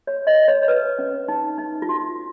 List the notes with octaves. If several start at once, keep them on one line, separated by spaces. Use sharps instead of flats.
C#5
D#5
C#5
C#5
B4
C#4
D#4
D#4
F4
F#4